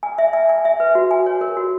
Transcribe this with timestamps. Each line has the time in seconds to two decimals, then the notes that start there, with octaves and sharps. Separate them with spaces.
0.03 G#5
0.18 E5
0.33 G#5
0.49 G#5
0.65 E5
0.80 B4
0.95 F#4
1.11 G#5
1.26 C#5
1.41 A#4
1.57 F#4